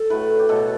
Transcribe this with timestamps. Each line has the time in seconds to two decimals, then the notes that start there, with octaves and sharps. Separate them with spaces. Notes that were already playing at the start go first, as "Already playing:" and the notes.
Already playing: A4
0.10 A2 F#3 A3 B4
0.39 G4
0.49 B2 F#3 A3 A4